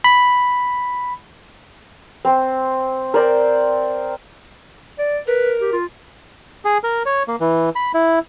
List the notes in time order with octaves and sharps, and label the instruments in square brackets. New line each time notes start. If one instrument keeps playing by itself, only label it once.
[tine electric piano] B5
[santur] C4
A#4 C5 D5
[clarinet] D5
[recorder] A#4 [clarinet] B4
[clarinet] G4
F4
[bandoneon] G#4
A#4
C#5
A#3
E3
B5
E4